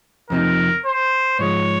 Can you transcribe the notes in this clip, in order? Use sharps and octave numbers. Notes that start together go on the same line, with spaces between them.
F2 C3 F3 C4 D#4 A#4
C5
G#2 F3 G#3 C#5